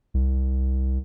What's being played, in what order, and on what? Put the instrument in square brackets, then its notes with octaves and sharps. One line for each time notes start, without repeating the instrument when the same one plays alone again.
[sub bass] C2